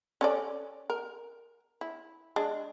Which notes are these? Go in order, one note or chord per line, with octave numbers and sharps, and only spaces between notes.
C#4 A4 D5
A#4
E4
G#3 D4